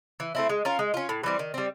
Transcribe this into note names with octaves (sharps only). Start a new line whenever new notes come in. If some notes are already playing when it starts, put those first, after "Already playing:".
E3
A3 C4 E4
G#3
C#4 F4 A#4
G#3
C#4 F4
A2
E3 G3 C4
D#3
G3 C4